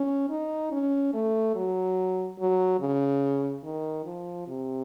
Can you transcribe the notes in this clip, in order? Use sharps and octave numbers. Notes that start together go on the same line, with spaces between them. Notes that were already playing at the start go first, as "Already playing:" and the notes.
Already playing: C#4
D#4
C#4
A3
F#3
F#3
C#3
D#3
F3
C3